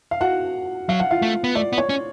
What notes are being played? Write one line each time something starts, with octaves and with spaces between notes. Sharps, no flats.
F5
F#4 F#5
F#3 F5
F#5
F4 F5
A3
B3
A3 D5
B3
C#5
C#4